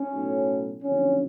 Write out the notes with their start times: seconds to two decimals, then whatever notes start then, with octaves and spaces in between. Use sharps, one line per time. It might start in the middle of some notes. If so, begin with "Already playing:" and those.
Already playing: C#4
0.10 B1 A2
0.82 F#1 F2 D3 C#4